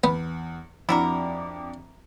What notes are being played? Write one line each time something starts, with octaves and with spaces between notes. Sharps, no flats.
E2 B3
F2 D4 E4 F#4 A#4 D6